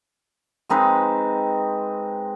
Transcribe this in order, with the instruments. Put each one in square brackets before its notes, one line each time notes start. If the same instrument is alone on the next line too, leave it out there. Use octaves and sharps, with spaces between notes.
[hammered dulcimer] G#3 C4 D#4 B4